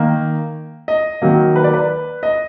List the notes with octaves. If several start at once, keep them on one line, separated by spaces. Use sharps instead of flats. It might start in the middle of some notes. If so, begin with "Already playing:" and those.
Already playing: D#3 A#3
D#5
D#3 F#3 A#3
B4
D5
B4
D#5